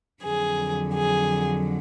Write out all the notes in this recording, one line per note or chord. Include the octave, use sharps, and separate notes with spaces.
F2 D3 F#3 G#4
G#4